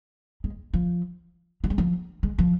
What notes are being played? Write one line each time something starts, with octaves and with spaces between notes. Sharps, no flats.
G#3
F3
F3
G#3
F3
G#3
F3